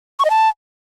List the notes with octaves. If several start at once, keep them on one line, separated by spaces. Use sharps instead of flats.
C#6
D#5
A5